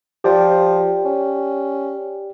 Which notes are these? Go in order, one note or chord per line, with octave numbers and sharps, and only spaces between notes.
F3 G4 D5 G5
C#4